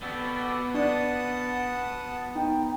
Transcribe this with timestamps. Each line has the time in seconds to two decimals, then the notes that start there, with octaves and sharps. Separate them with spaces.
0.02 B3 F#4 G4 A4 D5
0.74 D4 F#5 A5 D#6
2.35 D#4 G5